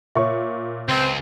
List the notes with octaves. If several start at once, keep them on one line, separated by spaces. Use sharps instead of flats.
A#2 C#5 E5 C#6
C#2 C4